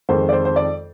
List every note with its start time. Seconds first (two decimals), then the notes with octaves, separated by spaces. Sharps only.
0.09 F2 D#3 G#3 C5
0.29 D5
0.33 C5
0.45 C5
0.56 D5